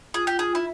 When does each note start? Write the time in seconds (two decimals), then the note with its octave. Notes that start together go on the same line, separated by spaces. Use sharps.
0.14 F4 G#4
0.27 G4
0.39 F4 G#4
0.55 E4